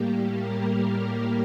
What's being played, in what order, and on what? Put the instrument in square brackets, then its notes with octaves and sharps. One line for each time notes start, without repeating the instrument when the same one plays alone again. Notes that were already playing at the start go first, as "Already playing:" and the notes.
Already playing: [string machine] A2 G3 A#3 G4
A#4